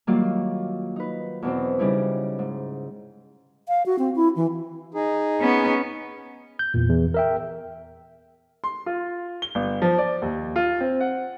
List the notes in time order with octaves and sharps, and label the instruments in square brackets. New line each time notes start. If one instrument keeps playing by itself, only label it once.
[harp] D#3 F#3 G3 A#3 F4
D#4 B4
E2 B2 C4
C#3 G3 D#4 E4
G#2
[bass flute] F5
F#4
C4
E4
E3
[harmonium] D#4 G#4
[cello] B3 C#4
[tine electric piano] G6
E2 A#2
E2
A#4 E5 G5
[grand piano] C6
F4
G7
G1
F3
D5
D#2
F4
C4
F#5